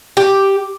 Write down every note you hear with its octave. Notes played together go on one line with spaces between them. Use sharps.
G4